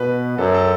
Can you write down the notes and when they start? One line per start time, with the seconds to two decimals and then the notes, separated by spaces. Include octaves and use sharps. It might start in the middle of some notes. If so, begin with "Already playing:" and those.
Already playing: B2 B4
0.38 F#2 A4
0.54 A4